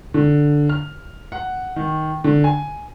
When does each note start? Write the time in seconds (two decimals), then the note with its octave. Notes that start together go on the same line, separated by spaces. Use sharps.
0.14 D3
0.69 F6
1.32 F#5
1.76 D#3
2.24 D3
2.44 G#5